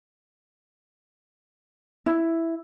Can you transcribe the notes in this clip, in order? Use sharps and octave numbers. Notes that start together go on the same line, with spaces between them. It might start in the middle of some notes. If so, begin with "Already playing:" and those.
E4